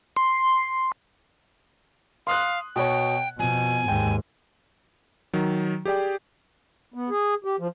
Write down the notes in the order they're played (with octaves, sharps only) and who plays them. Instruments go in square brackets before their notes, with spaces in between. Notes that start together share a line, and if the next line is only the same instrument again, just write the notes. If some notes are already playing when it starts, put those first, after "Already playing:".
[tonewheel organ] C6
[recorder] F5 [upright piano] C6 D#6 F#6
[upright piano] B2 C#5 [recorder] G5
[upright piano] F2 [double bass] B2 [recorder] G#5
[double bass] D#2 G#2 [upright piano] G5
[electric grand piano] D#3 F#3
G4 G#4 D5 G5
[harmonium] B3
G#4
G4
F3